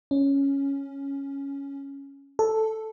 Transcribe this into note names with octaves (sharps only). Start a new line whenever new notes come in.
C#4
A4